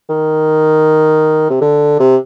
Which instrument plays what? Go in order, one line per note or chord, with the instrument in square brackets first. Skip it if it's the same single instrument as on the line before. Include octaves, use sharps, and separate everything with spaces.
[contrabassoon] D#3
C3
D3
C3